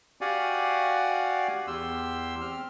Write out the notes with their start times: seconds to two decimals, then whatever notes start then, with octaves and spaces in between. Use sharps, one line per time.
0.21 F#4 G4 D5 F5 F#5 G#5
1.67 E2 G4 C6 E6
2.41 C4 F6